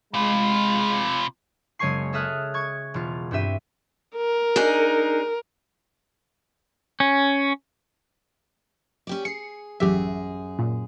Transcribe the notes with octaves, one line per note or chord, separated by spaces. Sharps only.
C3 G#3 F4 B5
F#1 G#3 C#5 G#5 C#6 C7
G#4 A4 E5 D#6 F6 F#6
C#6 G#6
E1 F4
G2 C4 G4 E5 D#7
A#4
D4 D#4 G#4
C#4
C#4 G4 D5
G#4 C7 C#7
A1 F#2 G4 G#4 E5
A#2